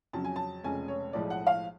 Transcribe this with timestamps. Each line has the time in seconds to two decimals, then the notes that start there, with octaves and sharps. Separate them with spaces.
0.13 F2 C#3 F#3 C#4 A5
0.25 G#5
0.36 A5
0.64 F1 F2 C#3 G#3 C#4 G#5
0.88 C#5
1.13 B1 A2 F3 G#3 D5
1.30 F#5
1.47 F5